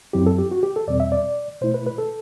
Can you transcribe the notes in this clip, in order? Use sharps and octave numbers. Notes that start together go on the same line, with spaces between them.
F#2 F#3 C4 E4 G4
A4
G4
F#4
G4
A4
E2 B2 G3 C4 D5
E5
D5
B2 A3 E4 C5
B4
B4
A4